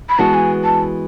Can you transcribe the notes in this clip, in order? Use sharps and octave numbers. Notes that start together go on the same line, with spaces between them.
B5
E3 G#3 B3 F#4 A5
G#5
A5